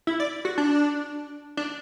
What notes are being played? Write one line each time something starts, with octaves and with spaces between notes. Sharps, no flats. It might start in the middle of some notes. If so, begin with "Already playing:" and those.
E4
D5
F#4
D4
D4